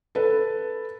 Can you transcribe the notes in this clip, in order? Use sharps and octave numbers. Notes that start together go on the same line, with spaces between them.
A4 B4